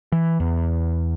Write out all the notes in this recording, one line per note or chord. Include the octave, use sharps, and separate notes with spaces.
E3
E2